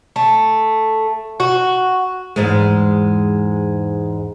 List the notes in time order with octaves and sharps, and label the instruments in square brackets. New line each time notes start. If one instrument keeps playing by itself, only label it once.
[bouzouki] A3
F#4
[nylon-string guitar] E2 G#2 G#3